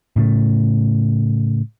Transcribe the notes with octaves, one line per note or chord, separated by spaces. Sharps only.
A2 C#3 A3